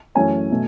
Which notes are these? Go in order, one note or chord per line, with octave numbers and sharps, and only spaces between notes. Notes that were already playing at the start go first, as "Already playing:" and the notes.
F#2 E3 A3 C#4 G#5
B2 A3